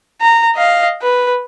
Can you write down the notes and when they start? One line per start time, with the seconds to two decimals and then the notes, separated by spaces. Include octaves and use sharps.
0.21 A#5
0.55 D#5 F5
1.02 B4